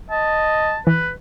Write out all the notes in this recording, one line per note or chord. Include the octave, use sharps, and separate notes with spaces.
D#5 A5
E3 B4